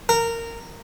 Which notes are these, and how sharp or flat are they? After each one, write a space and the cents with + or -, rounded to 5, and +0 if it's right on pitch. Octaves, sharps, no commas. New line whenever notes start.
A#4 -15